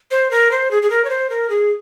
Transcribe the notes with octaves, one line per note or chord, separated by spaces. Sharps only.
C5
A#4
C5
G#4
G#4
A#4
C#5
C5
A#4
G#4